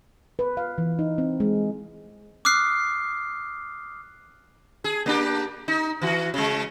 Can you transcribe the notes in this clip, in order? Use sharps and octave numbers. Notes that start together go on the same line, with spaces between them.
B4
F5
E3
D#4
C4
G#3
D6 D#6 F6 F#6 C7
G#4
A#3 D4 G4
D#4
E3 F#4
C#3 G#3